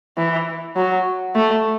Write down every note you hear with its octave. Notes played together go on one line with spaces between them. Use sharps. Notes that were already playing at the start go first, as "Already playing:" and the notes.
E3
F#3
A3